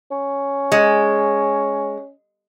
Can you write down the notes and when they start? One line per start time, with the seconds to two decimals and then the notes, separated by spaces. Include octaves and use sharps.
0.11 C#4
0.72 G#3